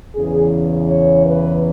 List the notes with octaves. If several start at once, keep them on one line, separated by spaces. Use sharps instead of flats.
E2 C#3 E3 G#4
C#5
B4